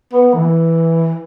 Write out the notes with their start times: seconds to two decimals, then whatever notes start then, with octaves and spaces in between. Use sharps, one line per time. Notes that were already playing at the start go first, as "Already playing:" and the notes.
0.12 B3
0.33 E3